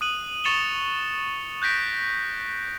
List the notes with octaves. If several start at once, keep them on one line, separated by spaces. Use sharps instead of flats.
D#6 F#6 D#7 F#7
C#6 A6 C#7 E7 F7 G7
F#6 G6 A#6 B6 D7